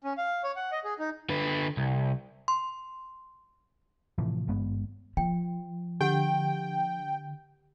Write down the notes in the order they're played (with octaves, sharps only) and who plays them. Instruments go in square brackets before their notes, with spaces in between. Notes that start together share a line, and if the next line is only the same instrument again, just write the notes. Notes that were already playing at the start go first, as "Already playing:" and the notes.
[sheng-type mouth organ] C#4
F5
C#5
F#5
D#5
G#4
D#4
[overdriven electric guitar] D3 B4
C2
[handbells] C6
[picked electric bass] A2 C3 E3 F3
G#1 G2 G#3 B3
[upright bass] F3 [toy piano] G5
[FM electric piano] D3 [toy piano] G4 F#5 [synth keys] G5